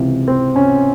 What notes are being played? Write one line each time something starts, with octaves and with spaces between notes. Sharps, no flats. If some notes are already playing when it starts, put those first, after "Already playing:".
Already playing: C#2 C3 E3
C4
C#4